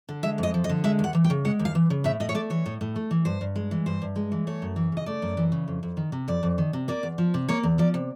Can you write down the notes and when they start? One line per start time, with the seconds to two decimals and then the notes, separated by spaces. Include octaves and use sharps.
0.09 D3
0.23 G#3 E5
0.38 F2
0.43 D#5
0.54 F3
0.64 D#5
0.69 D3
0.84 G#3 E5
0.99 D#2
1.04 F#5
1.15 E3
1.24 G5
1.30 C#3
1.45 G#3 F#5
1.59 D#2
1.65 F5
1.75 E3
1.90 C#3
2.04 A2 E5
2.20 A2 D#5
2.29 C#5
2.35 A3 D5
2.50 E3 C#5
2.66 A2
2.81 A2
2.96 A3
3.11 E3
3.25 G2 C5
3.41 G2
3.56 G#3
3.71 E3
3.86 G2 C5
4.02 G2
4.16 G#3
4.32 E3
4.47 A3 C#5
4.62 F#2
4.76 E3
4.92 C#3 D#5
5.06 A3 D5
5.22 F#2
5.37 E3
5.52 C#3
5.68 F2
5.83 F2
5.97 D#3
6.12 C3
6.28 F2 D5
6.43 F2
6.58 D#3
6.73 C3
6.88 A#3 D5
7.03 E2
7.18 F3
7.34 C3
7.48 A#3 C#5
7.63 E2
7.78 F3 D5
7.94 C3